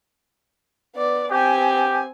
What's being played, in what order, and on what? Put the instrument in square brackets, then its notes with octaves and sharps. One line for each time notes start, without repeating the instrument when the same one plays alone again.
[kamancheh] B3 D5
[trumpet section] B3 G4 [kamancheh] C4 G#5